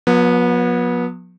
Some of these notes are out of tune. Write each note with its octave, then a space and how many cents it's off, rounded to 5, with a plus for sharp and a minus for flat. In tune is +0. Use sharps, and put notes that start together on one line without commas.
F3 +45 B3 -25